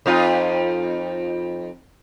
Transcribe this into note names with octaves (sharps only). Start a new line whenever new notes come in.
F2 D#4 F4